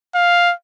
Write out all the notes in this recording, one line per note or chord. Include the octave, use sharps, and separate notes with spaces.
F5